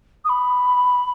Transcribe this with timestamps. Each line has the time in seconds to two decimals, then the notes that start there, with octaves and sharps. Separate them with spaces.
0.24 D#6
0.29 B5